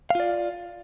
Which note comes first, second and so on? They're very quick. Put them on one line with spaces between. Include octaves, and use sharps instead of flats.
F5 F4 D5